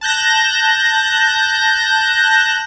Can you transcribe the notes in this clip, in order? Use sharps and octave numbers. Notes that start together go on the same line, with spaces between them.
A5 F#6 G6 A#6